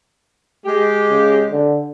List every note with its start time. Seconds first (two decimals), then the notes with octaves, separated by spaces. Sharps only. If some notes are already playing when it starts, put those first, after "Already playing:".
0.66 G#3 G4
1.10 C#3
1.52 D3